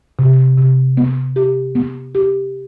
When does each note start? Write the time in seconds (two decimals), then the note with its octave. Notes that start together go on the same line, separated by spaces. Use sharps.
0.19 C3
0.58 C3
0.97 B3
1.36 G4
1.75 B3
2.15 G4